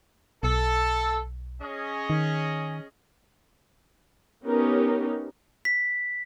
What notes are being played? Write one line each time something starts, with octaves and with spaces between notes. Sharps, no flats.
B1 A4
C#4 G#4 D#5
D#3
B3 C#4 D#4 G4 A#4
B6